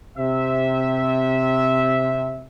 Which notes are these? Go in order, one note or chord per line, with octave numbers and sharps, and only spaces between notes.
C3 E5